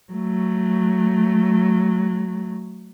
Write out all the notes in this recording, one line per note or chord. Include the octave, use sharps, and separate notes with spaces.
F#3 A3